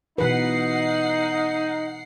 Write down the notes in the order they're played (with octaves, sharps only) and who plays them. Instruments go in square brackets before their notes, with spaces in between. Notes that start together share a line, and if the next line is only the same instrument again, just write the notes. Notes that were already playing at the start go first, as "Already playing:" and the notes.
[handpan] B2 E3 B4 [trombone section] D#4 [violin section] F#5 C7